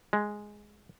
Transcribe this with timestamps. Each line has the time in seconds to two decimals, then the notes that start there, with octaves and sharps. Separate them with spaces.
0.13 G#3